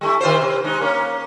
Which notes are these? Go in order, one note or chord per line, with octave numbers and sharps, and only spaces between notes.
G3 A3 E4
D#3 F4 C5
C3
G#3 D#4
A#3 C#4